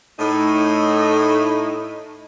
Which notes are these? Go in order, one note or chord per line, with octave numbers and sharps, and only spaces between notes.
A2 D#4